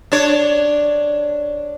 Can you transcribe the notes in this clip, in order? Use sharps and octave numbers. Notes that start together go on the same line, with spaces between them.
D4 C#5